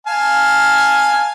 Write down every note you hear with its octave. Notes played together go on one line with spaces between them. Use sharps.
F5 G#5 A5